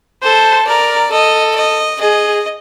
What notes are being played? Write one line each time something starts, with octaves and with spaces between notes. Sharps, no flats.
A4 C5
A#4 D5
A4 D#5
D#5
G#4 D#5